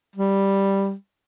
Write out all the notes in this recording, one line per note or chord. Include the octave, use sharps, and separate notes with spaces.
G3